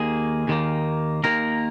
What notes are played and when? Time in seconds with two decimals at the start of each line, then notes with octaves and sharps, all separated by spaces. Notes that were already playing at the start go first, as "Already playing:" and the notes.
Already playing: D#2 D#3 A#3 G#4
0.48 D#2 D#3 A#3
1.24 D#2 D#3 A#3 A#4